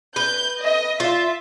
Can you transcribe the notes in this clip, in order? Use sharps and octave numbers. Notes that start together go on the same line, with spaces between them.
B4 G6
D#5
F4 E5